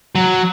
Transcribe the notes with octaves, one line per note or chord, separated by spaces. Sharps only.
F#3